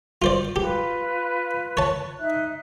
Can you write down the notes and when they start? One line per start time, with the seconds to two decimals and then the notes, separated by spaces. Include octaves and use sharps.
0.22 F4 C5 D5
0.56 F4 G4 B4
1.77 C#5 A5
2.19 D#4 E5 F#6